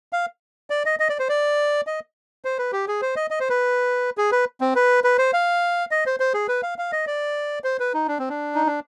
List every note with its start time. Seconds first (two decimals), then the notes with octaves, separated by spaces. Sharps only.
0.13 F5
0.70 D5
0.86 D#5
1.00 D#5
1.09 D5
1.19 C5
1.29 D5
1.87 D#5
2.45 C5
2.58 B4
2.72 G4
2.88 G#4
3.02 C5
3.16 D#5
3.30 D#5
3.40 C5
3.50 B4
4.18 G#4
4.32 B4
4.61 C4
4.76 B4
5.04 B4
5.18 C5
5.33 F5
5.91 D#5
6.06 C5
6.20 C5
6.34 G#4
6.48 B4
6.63 F5
6.78 F5
6.92 D#5
7.07 D5
7.64 C5
7.80 B4
7.94 D#4
8.08 D4
8.19 C4
8.29 D4
8.55 D#4
8.67 D4